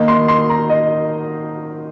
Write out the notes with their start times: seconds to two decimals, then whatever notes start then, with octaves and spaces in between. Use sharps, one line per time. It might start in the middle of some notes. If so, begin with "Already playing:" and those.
Already playing: D#3 A#3 D#4
0.08 C6
0.28 C6
0.50 A#5
0.70 D#5